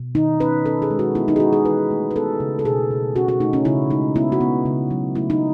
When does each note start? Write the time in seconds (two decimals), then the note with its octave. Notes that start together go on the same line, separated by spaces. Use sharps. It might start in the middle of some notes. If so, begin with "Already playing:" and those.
Already playing: B2
0.15 D#3 D#4
0.40 C#4 B4
0.65 C#4 A4
0.82 G#4
0.90 G#3
0.99 F#4
1.15 B3 E4
1.28 D#4
1.36 G#4
1.40 G#3 F#4
1.53 G#4
1.65 E3 B4
1.91 A3
2.11 B4
2.16 B3 A4
2.40 C#3
2.59 A4
2.65 B2 G#4
2.91 B2
3.15 C#4 F#4
3.28 F#4
3.41 A3 D#4
3.53 C#4
3.65 C#3 E4
3.90 G#3 D#4
4.16 B3 E4
4.32 F#4
4.41 B3
4.66 C#3
4.91 F#3
5.15 A3 E4
5.30 D#4